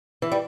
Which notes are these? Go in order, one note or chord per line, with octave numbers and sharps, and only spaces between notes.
E3
G3